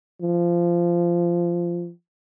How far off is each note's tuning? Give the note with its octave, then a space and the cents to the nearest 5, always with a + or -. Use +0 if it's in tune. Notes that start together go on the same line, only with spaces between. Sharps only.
F3 -15